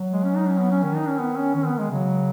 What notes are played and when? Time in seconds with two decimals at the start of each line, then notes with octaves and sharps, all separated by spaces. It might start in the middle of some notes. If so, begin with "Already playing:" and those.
Already playing: F#3
0.12 G#3
0.24 C#4
0.36 D#4
0.48 C#4
0.60 B3
0.71 C#4
0.83 D#3 C#4
0.95 D#4
1.08 C#4
1.19 B3
1.36 C#4
1.55 D#3 C#4
1.66 B3
1.72 D#3
1.78 G#3
1.90 C#3 F#3